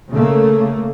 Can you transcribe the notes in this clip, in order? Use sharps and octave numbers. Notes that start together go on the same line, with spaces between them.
C#3 A3 A#3